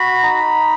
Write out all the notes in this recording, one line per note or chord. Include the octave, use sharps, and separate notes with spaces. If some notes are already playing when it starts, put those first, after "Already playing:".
Already playing: F#4 B5
D#4